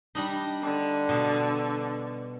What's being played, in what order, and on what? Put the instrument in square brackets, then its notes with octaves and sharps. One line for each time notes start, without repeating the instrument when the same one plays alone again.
[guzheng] G3 D4 D#4
[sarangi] D3
[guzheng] B2